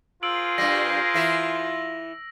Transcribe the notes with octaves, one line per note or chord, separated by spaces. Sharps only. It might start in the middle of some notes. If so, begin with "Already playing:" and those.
F4 G#4 A#4 C5 E6 D7 F#7
G2 G3 A#6
E3 E4 E5